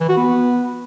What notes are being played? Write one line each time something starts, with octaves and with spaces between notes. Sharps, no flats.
E3
F#4
B3